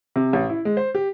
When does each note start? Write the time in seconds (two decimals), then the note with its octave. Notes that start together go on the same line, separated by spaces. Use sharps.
0.16 C3
0.33 A1
0.49 E4
0.65 G#3
0.77 C5
0.95 G4